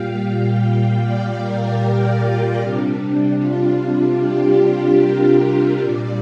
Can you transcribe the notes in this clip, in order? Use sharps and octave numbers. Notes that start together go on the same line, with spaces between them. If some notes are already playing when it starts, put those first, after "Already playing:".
Already playing: A#2 G3 F5 G5
F5
D5
A#4
G4
F4
C3 G3 D4
F4
G4
A#4
A#2 G3 D5